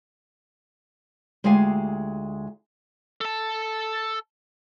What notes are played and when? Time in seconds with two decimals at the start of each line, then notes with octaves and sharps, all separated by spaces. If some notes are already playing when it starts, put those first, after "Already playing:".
1.44 D2 G#3 F4 G4 F5 G#5
3.21 A4 A5